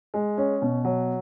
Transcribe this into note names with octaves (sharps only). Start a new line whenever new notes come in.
G#3
C#4
B2
F#3